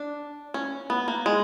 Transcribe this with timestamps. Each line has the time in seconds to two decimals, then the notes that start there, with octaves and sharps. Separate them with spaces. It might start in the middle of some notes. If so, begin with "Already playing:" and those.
Already playing: D4
0.54 C#4
0.90 B3
1.08 A#3
1.26 G#3